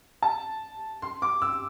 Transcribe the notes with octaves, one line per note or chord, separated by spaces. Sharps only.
A5
C6
D6
E6